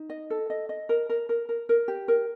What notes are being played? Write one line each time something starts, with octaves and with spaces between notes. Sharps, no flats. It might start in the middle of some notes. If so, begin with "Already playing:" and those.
Already playing: D#4
D#5
A4
D#5
D#5
A#4
A#4
A#4
A#4
A#4
G4
A#4